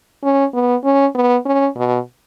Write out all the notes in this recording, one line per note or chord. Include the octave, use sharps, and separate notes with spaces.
C#4
B3
C#4
B3
C#4
B2